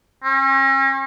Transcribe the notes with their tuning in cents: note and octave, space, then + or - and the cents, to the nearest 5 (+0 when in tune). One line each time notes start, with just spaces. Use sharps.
C#4 -40